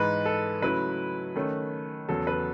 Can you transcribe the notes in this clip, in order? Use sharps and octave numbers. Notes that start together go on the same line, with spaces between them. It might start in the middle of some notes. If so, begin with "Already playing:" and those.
Already playing: G#2 E3 G#3 D#4 B4
A4
C#3 F#3 A3 E4 B4
D#3 A3 C#4
E2 C#3 F#3 A4
B4